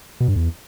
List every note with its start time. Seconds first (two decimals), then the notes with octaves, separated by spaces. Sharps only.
0.20 B2
0.28 G2
0.36 E2